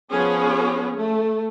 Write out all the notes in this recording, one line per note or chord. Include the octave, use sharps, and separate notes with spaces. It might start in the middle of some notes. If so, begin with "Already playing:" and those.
F3 B3 C#4 G#4 C#5
A3